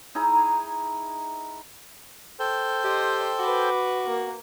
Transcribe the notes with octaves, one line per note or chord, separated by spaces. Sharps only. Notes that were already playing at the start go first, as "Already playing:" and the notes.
D#4 E4 G#4 A#5
A4 C5 G5
G4 D#5 C6
F#4 B4 D6
A#3